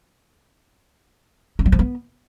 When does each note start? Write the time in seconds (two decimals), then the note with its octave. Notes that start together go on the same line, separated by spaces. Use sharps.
1.59 C#4
1.66 G3
1.72 F3
1.79 B3